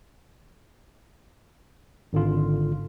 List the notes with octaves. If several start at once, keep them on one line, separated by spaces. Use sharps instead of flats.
G#1 D3 F4